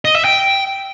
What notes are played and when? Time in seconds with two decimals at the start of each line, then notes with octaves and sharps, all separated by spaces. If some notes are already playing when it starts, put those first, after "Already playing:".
0.05 D#5
0.15 E5
0.25 G5